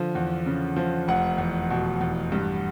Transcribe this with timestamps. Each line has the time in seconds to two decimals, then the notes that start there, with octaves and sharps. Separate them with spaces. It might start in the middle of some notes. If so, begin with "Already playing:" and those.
Already playing: D3 F3
0.15 E2
0.46 C#3
0.76 F3
1.08 F1 F#5
1.38 E2
1.70 B2
2.01 E2
2.32 G2